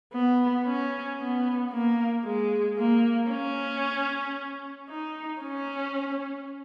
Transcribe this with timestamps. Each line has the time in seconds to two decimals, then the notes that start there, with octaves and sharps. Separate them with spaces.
0.13 B3
0.66 C#4
1.19 B3
1.72 A#3
2.25 G#3
2.78 A#3
3.31 C#4
4.90 D#4
5.42 C#4